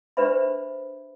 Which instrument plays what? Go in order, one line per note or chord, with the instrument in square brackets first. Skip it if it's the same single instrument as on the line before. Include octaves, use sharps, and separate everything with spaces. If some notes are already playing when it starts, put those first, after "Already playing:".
[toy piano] D4 G4 B4 C5 E5 B5